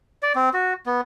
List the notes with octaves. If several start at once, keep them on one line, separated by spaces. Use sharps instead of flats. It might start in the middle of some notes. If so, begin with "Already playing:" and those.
D5
C4
F#4
B3